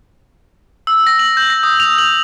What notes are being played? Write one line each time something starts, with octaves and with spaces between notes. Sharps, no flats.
E6
A#6
F#7
G6
A#6
D#6
F7
F#7